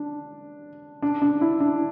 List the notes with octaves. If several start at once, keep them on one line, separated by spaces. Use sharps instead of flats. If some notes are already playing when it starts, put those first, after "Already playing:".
Already playing: D4
D4
D4
E4
D4